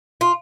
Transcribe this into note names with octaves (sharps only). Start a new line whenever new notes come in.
F4